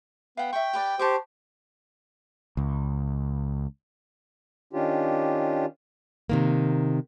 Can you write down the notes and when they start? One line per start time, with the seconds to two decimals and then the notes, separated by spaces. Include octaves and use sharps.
0.37 B3 F5 G5
0.53 E5 G5 C#6
0.73 G4 B4 D5
0.99 G4 C5 A5 C#6 D6
2.57 C#2
4.73 D#3 C#4 D4 F4 G4
6.30 C3 D#3 A#3